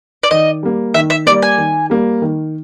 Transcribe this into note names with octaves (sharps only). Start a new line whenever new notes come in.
D5
D#3 D#5
G3 A#3
D#3 E5
E5
G3 A#3 D5
G#5
D#3
G3 A#3
D#3